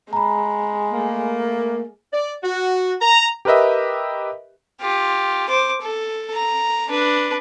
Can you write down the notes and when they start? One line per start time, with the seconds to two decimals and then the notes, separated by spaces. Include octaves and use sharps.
0.13 G#3 A#5 B5
0.93 A3 A#3
2.12 D5
2.43 F#4
3.00 A#5
3.45 G4 A#4 B4 D#5 E5
4.81 F4 G4
5.49 C5 D6
5.81 A4
6.34 A#5
6.89 D4 B4